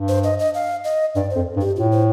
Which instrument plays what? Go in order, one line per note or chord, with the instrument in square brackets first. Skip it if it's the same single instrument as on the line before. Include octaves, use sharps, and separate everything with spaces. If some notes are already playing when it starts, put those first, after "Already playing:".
Already playing: [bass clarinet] G2
[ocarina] C5
D#5
D#5
F5
D#5
[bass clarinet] G2 [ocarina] D5
[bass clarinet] F2 [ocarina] C5
[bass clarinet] G2
[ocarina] G4
[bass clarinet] A2 [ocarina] F4
[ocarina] C5